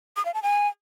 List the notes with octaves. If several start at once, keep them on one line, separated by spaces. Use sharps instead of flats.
D#6
F5
A5
G#5